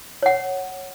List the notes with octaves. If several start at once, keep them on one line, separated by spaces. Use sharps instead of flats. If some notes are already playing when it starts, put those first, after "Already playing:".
C#5 F#5